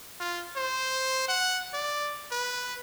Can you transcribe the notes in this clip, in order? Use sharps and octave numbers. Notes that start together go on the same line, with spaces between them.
F4
C5
F#5
D5
B4